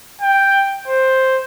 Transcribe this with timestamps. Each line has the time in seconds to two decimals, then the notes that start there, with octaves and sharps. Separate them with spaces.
0.21 G5
0.88 C5